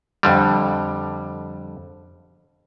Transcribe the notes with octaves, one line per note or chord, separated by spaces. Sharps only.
F2 D3 G3